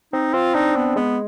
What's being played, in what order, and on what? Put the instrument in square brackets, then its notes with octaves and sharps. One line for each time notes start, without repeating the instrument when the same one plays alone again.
[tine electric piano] C4 [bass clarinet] D#4
[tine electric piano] C4 [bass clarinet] F4
[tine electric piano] D4 [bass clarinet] D#4
[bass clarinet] B3
[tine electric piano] G#3 [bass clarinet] B3